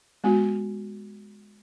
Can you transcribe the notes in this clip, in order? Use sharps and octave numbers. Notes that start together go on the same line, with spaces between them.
G#3 B3 F#4